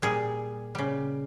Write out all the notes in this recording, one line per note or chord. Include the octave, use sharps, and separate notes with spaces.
A#2 G3 G#4
C#3 G3